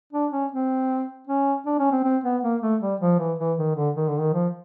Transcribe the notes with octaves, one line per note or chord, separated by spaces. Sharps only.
D4
C#4
C4
C#4
D4
C#4
C4
C4
B3
A#3
A3
G3
F3
E3
E3
D#3
D3
D#3
D3
D#3
F3